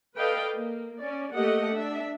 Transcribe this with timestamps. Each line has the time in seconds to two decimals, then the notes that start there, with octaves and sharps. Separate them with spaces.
0.17 A4 B4 D5 D#5 F5 G5
0.54 A#3
1.00 C#4 D5
1.33 A3 A#3 G4 D#5 F#5
1.74 D4 E5